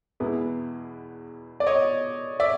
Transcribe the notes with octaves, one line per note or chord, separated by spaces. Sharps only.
E2 B2 G#3 B3 E4
D5
C#5 D#5
D5 E5